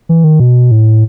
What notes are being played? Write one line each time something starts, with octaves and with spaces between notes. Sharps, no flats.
E3
D#3
B2
A2